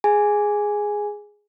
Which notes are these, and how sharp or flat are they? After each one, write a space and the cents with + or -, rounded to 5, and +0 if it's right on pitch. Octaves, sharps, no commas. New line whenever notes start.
G#4 +0 G#5 +0